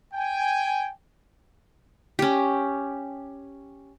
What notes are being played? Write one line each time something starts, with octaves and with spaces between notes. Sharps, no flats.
G5 G#5
C#4 G4